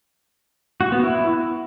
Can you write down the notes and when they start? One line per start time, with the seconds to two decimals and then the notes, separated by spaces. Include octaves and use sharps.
0.81 F#4
0.92 B3
1.04 E4